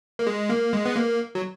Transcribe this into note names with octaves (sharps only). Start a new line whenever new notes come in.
A#3
G#3
A#3
G#3
B3
A#3
F#3